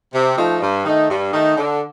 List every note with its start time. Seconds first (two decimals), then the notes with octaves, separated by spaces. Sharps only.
0.13 C3
0.37 F3 A3 D#4
0.61 G2
0.85 D#3 A3 D#4
1.09 G2
1.33 D#3 A3 D#4
1.57 D3